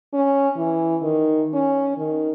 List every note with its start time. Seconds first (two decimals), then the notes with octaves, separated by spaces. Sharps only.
0.14 C#4
0.57 E3
1.02 D#3
1.54 C#4
1.97 D#3